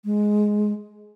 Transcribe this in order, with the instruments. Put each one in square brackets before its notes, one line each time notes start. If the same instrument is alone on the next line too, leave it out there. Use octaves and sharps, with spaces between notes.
[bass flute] G#3